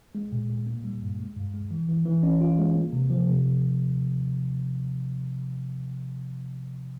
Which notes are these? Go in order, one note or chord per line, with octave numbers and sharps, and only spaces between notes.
G#3
A#2
A#2
A#3
G3
G2
G#3
G2
G#3
E3
E3
E3
C#4
F4
G#3
A#3
C3
F3
C3
F3
C3